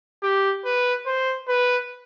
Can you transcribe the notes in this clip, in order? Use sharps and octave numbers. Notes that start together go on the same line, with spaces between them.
G4
B4
C5
B4